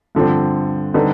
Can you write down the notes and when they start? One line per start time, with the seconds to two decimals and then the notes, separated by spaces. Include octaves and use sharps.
0.15 G2 D3 F3 C4
0.94 D3 G3 C4 D#4 B4